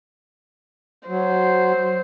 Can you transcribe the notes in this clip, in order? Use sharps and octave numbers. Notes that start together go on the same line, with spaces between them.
F#3 C5